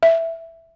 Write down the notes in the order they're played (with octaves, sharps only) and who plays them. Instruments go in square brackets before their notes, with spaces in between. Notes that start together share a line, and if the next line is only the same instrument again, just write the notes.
[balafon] E5